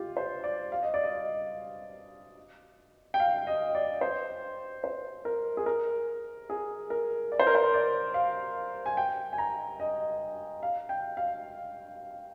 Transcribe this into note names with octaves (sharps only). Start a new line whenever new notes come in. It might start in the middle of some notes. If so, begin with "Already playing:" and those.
Already playing: F4 G4
C5
D5
F5
D#5
D5
D#5
G5
F5
D#5
D5
C5
C5
A#4
G#4
A#4
G#4
A#4
D5
C5
A#4
C5
D5
F5
G#5
G5
G#5
A#5
D#5
F5
G5
F5